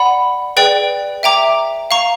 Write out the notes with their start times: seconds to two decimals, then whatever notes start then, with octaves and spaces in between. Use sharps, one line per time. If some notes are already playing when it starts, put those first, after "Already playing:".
Already playing: D5 F#5 B5
0.57 G#4 B4 D5 G5
1.23 E5 G5 A#5 D6
1.91 F5 A#5 C#6